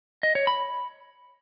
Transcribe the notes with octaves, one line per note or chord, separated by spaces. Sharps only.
D#5
C#5
B5